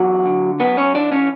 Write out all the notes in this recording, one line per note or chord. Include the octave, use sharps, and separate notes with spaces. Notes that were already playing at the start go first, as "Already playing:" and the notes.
Already playing: E2 F#3 F#4
D3
F#2 B3 B4
C#4 C#5
E3 D4 D5
C#4 C#5